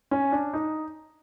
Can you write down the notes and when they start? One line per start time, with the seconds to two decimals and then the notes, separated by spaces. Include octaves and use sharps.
0.11 C#4
0.32 D4
0.54 D#4